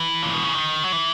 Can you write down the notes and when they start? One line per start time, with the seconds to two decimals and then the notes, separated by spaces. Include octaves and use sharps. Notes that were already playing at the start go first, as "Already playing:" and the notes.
Already playing: E3
0.23 A#2
0.33 B2
0.44 C#3
0.54 D#3
0.84 F#3
0.92 E3